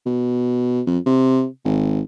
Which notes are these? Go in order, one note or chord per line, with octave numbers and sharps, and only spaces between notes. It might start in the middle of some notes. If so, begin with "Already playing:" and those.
B2
F2
C3
G#1